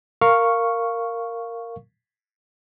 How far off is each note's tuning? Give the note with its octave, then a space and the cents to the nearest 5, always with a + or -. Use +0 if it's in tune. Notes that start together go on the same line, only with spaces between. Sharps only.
A#4 -10 F5 +0 C#6 +0